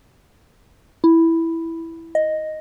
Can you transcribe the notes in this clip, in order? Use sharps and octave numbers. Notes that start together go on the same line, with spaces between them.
E4
D#5